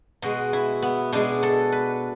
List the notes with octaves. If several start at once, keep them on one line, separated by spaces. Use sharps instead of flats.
B2 G#3 F#4
E4
B3
B2 G#3 D4
A4
B4